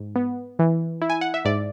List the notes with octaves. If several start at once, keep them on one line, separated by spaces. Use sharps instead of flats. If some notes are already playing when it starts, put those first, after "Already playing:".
Already playing: G#2
B3
E3
E4
G#5
F#5
E5
G#2 D5